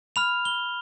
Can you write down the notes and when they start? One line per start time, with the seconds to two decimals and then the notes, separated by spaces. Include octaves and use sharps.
0.16 B5 F6 F7
0.45 G7